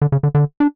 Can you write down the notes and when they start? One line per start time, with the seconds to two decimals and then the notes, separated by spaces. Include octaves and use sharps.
0.02 D3
0.12 C#3
0.23 D3
0.35 D3
0.60 D4